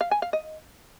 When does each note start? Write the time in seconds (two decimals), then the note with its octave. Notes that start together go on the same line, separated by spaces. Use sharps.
0.01 F5
0.11 G#5
0.22 F5
0.33 D#5